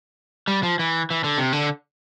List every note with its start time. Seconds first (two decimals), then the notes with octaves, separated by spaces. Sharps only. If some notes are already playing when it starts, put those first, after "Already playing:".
0.48 G3
0.63 F3
0.79 E3
1.10 E3
1.24 D3
1.38 C3
1.53 D3